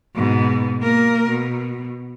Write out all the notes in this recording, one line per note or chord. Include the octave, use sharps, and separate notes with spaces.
G#2 B2
A#3 A#4
B2